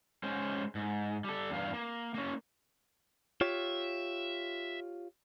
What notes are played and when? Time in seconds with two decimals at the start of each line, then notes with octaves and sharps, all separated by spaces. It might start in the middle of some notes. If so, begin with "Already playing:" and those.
0.23 G#3 C#4 C5
0.75 G#2
1.24 G3 A4
1.50 E2 G2 F5
1.73 A#3
2.15 A#3 C#4
3.41 F4 G4 C#5 E5